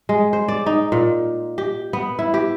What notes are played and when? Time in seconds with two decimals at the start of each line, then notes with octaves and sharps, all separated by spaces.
0.09 G#3
0.33 C5
0.48 D5
0.66 D#4
0.92 A#2
1.58 G4
1.93 B3
2.19 E4
2.34 G4